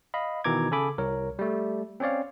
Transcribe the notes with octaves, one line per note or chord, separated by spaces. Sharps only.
D#5 F5 B5
B2 D#3 E3 A#5 D6 G#6
C#3 G#4 A4 G#5 B5 D6
C2 A#4 C#5
G3 A3
C4 C#4 C#5 D5 F5